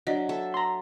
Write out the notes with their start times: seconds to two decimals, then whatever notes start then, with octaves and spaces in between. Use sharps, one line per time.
0.07 F#3 D4 D5 D#5
0.29 A4 E5
0.54 A#5 C6